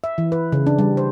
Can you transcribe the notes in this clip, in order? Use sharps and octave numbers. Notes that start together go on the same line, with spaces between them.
E5
E3
B4
C#3
D4
G3
C5